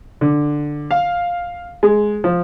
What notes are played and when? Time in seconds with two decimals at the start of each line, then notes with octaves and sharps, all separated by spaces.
0.21 D3
0.91 F5
1.83 G#3
2.24 F3